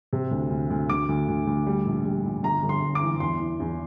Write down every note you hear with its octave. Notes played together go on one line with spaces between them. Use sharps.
C3
D2
D2
D2
D2 D6
D2
D2
D2
G3
A#1
G3
A#1
G1 A#5
G1
C6
G1
D6
E3
E2 C6
E3
E2